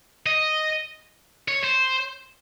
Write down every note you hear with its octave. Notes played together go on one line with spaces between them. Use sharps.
D#5
C#5
C5